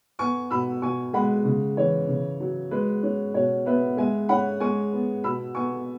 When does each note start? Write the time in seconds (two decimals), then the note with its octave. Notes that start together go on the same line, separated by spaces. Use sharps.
0.19 B3 G#5 C#6
0.51 B2 B5 E6
0.82 B2 G#5 C#6
1.13 G#3 F#5 B5
1.45 C#3
1.77 E3 C#5
2.09 C#3
2.40 F#3
2.71 G#3 B4
3.03 C#4
3.34 B2 C#5
3.66 B3 B4 E5
3.97 G#3 E5 G#5
4.29 C#4 F#5 B5
4.60 G#3 G#5 C#6
4.93 B3
5.24 B2 B5 E6
5.55 B3 G#5 C#6